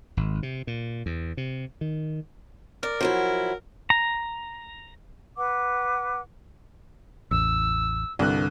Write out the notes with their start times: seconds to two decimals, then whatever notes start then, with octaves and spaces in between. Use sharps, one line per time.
0.17 G#1
0.43 C3
0.67 A#2
1.06 E2
1.37 C3
1.81 D#3
2.83 A#4 D5
3.01 F3 F#3 E4
3.90 A#5
5.37 B4 F#5 D6
7.31 A1 E2 E6
8.19 C2 G2 D3 F#6